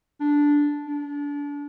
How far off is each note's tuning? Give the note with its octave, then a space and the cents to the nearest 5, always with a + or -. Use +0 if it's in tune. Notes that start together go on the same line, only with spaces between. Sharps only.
D4 -5
D4 -30